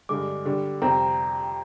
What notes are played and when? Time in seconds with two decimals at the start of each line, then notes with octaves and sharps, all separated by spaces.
0.09 G2 D3 G#3 D6
0.45 D3 G3 D4
0.82 F2 C3 G3 C4 A#5